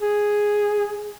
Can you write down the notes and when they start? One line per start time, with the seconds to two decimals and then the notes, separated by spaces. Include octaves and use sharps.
0.02 G#4